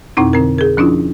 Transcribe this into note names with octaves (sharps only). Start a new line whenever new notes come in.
F2 B2 C4 D#4 E4
D3 C4 A#4
G#4 A#4
F3 C#4 D4 E4 F4